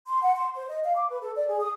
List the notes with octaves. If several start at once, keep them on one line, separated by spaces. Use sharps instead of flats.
C6
F#5
C6
C5
D#5
F5
D6
B4
A4
D5
G#4
D#6